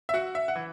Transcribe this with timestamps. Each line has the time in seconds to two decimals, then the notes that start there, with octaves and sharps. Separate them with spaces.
0.09 E5
0.14 F#4 F#5
0.35 E5
0.48 F#5
0.56 E3